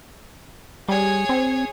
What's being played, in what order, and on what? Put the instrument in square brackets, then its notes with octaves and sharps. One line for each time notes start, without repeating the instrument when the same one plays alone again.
[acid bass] G3 [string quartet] G#4 C#5
[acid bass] C4